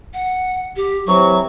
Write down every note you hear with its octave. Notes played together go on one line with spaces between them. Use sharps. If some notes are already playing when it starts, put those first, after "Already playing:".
F#5
G4
C3 E3 F#3 C#6